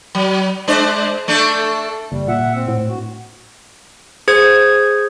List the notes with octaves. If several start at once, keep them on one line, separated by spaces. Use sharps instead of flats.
F#3
G#3 D4 C5
A3 D4 A4
F#1 G3
A#2 E5 F#5
C4
A2
G2 F#4
G#4 C5 G#6